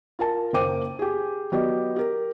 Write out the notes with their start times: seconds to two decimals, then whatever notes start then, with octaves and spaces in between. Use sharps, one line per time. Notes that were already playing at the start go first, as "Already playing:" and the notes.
0.19 F4 A#4 A5
0.53 F#1 A#3 C5 G5 D6 D#7
0.99 G4 G#4
1.52 F#3 B3 G4 B4 D5 D#5
1.96 G4 A#4